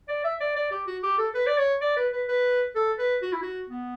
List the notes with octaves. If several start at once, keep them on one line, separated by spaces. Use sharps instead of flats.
D5
E5
D5
D5
G4
F#4
G4
A4
B4
D5
C#5
D5
B4
B4
B4
A4
B4
F#4
E4
F#4
B3